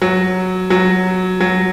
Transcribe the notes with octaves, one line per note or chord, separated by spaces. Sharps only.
F#3
F#3
F#3